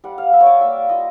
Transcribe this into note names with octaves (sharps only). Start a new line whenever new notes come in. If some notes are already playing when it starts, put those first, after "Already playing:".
G3 F#5
F5
G3 E5
C#5
D5
A#3 E5
F4 D#5